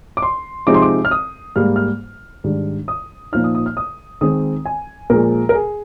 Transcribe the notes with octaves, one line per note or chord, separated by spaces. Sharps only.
D6
C6
C3 F3 G#3 C4 D#4 D6
C6
D6
F6
D#6
G#2 G3 A#3 F6
F6
G#2 D#3 G3 D4
D#6
A#2 F3 A#3 D#4 F6
D#6
D#6
F6
D#6
D#3 G#3 C4 D#6
G#5
A#2 F3 G#3 A#4
A#4
G#4